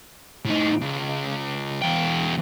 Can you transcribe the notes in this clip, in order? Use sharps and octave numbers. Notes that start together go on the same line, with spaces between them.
A2 D#4
C#2
E2 G5